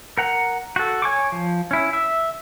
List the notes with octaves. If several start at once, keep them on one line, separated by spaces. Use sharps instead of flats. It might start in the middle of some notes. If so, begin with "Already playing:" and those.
A#4 F#5 A#5
F#4 A4
C#5 G#5 C#6 D6
F3
C#4 E4
E5